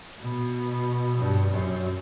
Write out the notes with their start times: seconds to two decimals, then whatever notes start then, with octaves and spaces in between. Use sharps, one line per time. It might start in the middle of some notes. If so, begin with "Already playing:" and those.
0.20 B2
1.17 G2
1.50 F#2